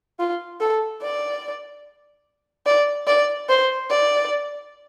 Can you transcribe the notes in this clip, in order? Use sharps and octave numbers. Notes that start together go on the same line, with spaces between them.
F4
A4
D5
D5
D5
C5
D5